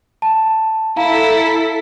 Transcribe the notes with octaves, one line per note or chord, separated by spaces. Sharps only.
A5
E4 A4 F5 A#5 B6